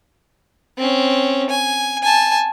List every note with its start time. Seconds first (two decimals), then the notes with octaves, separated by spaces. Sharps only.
0.78 C4 C#4
1.50 G#5
2.03 G#5 A5